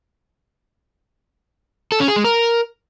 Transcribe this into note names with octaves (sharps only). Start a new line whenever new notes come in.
A4
C#4
G#4
G#3
A#4